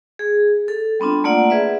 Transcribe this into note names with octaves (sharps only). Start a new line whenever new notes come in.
G#4
A4
G3 B3 C4 D4 F4
A3 A#3 F4 D5 F#5
G#4 B4 E5